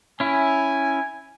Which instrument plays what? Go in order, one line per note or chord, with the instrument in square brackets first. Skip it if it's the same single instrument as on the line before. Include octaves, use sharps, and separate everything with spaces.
[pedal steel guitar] C#4 E4 [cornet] G#5